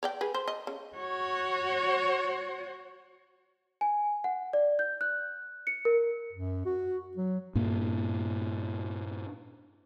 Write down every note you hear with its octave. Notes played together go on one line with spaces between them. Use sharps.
C#5 D5 G5
G#4 B4
C5
D#5
C#3
F#4 C#5
G#5
F#5
D5
G6
F#6
C#7
A#4
F#2
F#4
F#3
G2 A#2 A#3